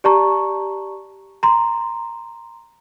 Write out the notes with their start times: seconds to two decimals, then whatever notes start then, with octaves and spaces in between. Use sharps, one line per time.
0.04 G4 D5 A5 A#5 C#6
1.43 A#5 C6